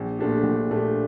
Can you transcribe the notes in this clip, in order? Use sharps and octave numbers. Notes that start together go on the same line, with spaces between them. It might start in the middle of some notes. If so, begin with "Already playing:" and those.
Already playing: A#1
A#2 A3 D4 G4
A#1
A#2 A3 D4 G4